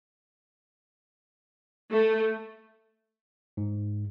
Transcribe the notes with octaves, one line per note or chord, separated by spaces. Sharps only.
A3
G#2